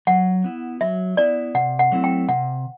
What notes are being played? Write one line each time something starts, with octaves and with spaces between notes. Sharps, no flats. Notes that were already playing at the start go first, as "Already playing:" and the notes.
F#3 F#5
B3 E4
F#3 E5
B3 E4 D5
C3 F#5
F#5
F#3 A3 C4 E4
G5
C3 F#5